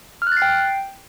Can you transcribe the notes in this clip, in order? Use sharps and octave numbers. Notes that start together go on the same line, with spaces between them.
F6
F#6
A6
C7
G5